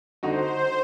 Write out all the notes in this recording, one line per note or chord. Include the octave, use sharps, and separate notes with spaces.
D3 D#4 F#4 C5